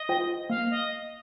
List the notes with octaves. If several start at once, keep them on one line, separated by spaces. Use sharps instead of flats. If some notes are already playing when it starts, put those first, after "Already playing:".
Already playing: D#5
F4 C5 G5
A#3 F5
D#5